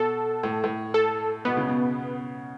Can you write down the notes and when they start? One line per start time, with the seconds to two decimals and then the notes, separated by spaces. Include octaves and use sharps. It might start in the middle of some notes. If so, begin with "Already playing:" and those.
Already playing: B2 A4
0.43 A2
0.64 A2
0.94 A4
1.45 B2 B3
1.57 C#3
1.68 B2